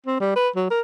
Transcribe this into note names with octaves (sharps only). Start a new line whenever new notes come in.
C4
G3
B4
F#3
A#4